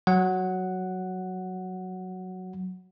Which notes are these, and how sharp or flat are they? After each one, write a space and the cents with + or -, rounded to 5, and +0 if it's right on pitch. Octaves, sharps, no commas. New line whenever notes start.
F#3 +0 F#5 +0